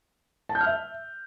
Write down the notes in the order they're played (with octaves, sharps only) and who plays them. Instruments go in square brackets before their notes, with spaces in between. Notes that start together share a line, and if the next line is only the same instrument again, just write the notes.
[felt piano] A5
G6
F6
E5